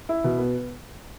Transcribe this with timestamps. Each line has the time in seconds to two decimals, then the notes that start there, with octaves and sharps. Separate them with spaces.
0.09 E4
0.24 B2
0.38 B3